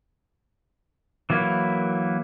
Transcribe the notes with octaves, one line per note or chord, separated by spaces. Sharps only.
E3 F#3 A#3 E4